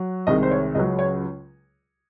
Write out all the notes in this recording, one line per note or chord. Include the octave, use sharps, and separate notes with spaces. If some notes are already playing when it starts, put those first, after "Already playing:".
Already playing: F#3
C2 C3 D#3 G#3 D#5
C5
C#5
C#2 C#3 F#3 D#5
C#5